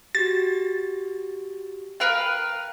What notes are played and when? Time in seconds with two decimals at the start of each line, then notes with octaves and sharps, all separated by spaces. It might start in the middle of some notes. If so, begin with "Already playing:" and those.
0.15 F#4 G4 A6
2.00 A#4 B4 F5 G5